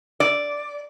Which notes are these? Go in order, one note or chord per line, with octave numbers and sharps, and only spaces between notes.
D5